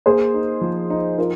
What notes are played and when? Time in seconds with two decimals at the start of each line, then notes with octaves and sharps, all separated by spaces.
0.06 A#3 G#4 C5
0.34 D#4
0.61 F3
0.90 D#4
1.18 D#4 F4 A#4